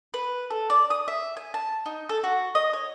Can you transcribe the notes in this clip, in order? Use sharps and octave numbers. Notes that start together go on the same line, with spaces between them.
B4
A4
D5
D#6
E5
G#5
A5
D#4
A4
F#4
D#5
C#5